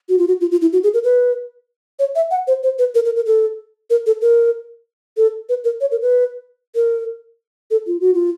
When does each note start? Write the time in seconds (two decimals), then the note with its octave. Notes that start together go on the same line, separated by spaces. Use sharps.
0.09 F#4
0.19 F4
0.28 F#4
0.41 F4
0.51 F4
0.61 E4
0.73 F#4
0.83 G#4
0.94 A#4
1.04 B4
1.99 C#5
2.15 E5
2.31 F#5
2.47 C5
2.63 C5
2.79 B4
2.95 A#4
3.05 A#4
3.16 A#4
3.26 A4
3.90 A#4
4.06 A4
4.22 A#4
5.17 A4
5.49 B4
5.64 A#4
5.81 C#5
5.91 A#4
6.02 B4
6.75 A#4
7.71 A4
7.87 F4
8.00 F#4
8.14 F4